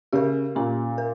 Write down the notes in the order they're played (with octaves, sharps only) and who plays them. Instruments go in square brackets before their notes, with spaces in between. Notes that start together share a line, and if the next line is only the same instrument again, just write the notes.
[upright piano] C#3 [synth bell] G4 A#4
[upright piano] A#2 [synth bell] C#4
[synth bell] A#4